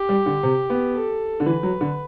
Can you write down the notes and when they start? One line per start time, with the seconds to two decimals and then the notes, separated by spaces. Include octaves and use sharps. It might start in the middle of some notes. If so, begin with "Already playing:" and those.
Already playing: G4
0.09 G3
0.26 D3
0.43 C3
0.70 B3
0.95 A4
1.40 D3
1.46 E3 B4
1.63 F#3
1.81 D3